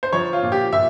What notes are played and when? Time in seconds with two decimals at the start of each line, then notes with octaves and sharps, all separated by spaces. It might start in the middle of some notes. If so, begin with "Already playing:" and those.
0.03 C5
0.12 F3 C#5
0.33 F4
0.43 A#2
0.52 G4
0.73 A#2 E5